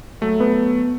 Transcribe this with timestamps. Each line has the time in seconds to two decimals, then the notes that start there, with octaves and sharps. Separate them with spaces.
0.21 F#3 A3
0.40 B3